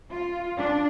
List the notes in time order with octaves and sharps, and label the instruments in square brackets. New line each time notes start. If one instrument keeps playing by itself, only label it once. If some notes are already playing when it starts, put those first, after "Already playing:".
[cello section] F4
D4